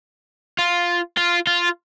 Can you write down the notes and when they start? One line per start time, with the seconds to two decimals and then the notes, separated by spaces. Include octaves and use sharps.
0.59 F4
1.17 F4
1.47 F4